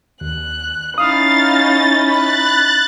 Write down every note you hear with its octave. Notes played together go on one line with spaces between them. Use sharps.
D#2 F#6
C#4 D#4 E4 F5 D#6 A6
B5 F#6 A6